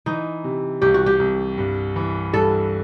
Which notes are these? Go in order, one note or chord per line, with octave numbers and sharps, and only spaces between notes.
E3 D#4
C3
C2 G4
F#4
G4
C2
G2
E3
G2 A4